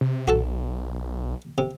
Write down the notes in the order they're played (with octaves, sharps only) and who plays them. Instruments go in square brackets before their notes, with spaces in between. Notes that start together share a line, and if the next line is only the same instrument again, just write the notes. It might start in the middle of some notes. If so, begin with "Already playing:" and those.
[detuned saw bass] C3
[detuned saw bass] B1 [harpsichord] F#4 A4 A5
[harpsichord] C3